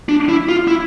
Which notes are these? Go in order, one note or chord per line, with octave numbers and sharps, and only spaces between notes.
D4
E4
F4
E4